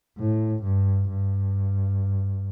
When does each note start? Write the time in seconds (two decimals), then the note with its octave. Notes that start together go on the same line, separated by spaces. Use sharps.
0.18 A2
0.63 G2
1.09 G2